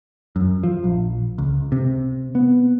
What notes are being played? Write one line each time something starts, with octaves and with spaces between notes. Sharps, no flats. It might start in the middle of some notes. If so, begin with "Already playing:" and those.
F#2
F3
A#1
C#2
C3
B3